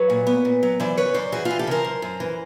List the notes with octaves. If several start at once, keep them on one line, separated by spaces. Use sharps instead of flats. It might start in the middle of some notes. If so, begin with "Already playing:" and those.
Already playing: F#3 B4 C#5
A#2
B3
A#2
F#3
E3 C5 D5
C#3 B4 C#5
F#2 C5 D5
E3 F#4 G#4
F4 G4
E3
G4 A4
C#3 A#4 C5
F#2
F#2
E3